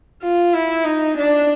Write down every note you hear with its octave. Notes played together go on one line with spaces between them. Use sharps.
F4
E4
D#4
D4